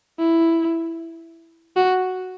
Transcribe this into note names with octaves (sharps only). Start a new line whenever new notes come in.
E4
F#4